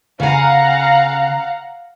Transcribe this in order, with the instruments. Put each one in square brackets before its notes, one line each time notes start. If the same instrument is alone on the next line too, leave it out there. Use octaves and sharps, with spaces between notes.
[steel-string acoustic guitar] C#3 G#5 [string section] F5 F#5 A#5